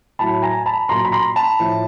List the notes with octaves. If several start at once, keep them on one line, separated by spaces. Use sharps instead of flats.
A2 F#3 A5 B5
G#5 A#5
A5 B5
A#2 F#3 A#5 C6
B5
A#5 C6
A5 B5
A2 F3